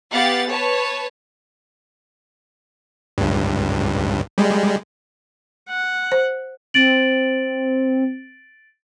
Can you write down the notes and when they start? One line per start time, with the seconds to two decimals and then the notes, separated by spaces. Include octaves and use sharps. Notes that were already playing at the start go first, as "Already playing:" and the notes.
0.12 B3 G4 F5 F#5 A6
0.50 B4 C#5 A5
3.18 C#2 G2
4.38 G3 G#3
5.69 F#5
6.12 C5
6.74 C4 A6 D7 F#7